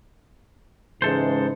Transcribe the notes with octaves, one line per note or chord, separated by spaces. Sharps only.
G#2 C#3 E3 G#3 A4 C5